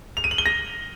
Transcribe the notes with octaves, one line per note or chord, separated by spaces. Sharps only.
F7
D#7
F#7
G7
A#6